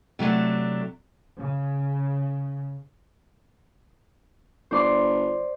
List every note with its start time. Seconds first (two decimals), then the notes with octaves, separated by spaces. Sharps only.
0.19 C3 F#3 A3 D4
1.38 C#3
4.71 G1 C5 D5 C6